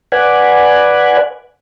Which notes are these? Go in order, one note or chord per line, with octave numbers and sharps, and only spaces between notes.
B4 D5 F#5 G#5